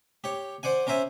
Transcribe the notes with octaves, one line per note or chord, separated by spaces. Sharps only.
G4 C#5
C5 D5 F#5 G#5
C#4 A#4 C5 E5 G#5